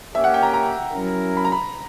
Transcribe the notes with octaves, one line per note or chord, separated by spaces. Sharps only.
A#3 C#4 G4 E5
F#5
G5
A#5
A#5
F#3 C#4 E4 A#4
B5
A#5
B5